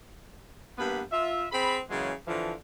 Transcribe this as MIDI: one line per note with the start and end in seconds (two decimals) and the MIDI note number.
0.78 1.00 43
0.78 1.00 58
0.78 1.00 59
0.78 1.00 83
1.12 1.46 65
1.12 1.46 76
1.52 1.77 60
1.52 1.77 68
1.52 1.77 83
1.89 2.12 49
1.89 2.12 52
1.89 2.12 54
1.89 2.12 56
1.89 2.12 58
2.27 2.53 50
2.27 2.53 52
2.27 2.53 53